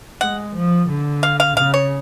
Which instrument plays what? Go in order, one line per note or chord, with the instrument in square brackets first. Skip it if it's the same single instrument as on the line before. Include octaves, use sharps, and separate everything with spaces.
[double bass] G#3 [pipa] F#5
[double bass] F3
D3
[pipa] F5
F5
[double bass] C#3 [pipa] F5
[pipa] C#5